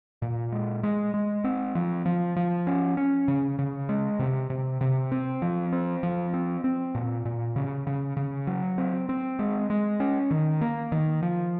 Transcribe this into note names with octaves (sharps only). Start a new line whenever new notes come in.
A#2
G#3
G#3
G#3
C4
F3
F3
F3
C#4
C#4
C#3
C#3
G#3
C3
C3
C3
C4
F3
C4
F3
C4
C4
A#2
A#2
C#3
C#3
C#3
F#3
C4
C4
G#3
G#3
C#4
D#3
A#3
D#3
F3